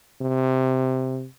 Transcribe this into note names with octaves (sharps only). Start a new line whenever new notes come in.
C3